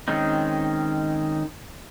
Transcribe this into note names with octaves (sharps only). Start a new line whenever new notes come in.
D#3 G#3 C4 C#4 D#4